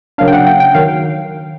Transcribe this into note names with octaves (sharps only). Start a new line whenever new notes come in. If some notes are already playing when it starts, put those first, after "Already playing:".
C#3 F#3 A#3 D4 F5
G5
F#5
G5
G5
D#3 F#3 F5